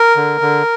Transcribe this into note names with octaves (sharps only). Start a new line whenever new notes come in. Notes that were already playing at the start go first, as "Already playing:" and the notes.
Already playing: A#4
D3
D3